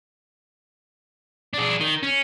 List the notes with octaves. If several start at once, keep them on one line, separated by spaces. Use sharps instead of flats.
D4 G#4
D#3
C#4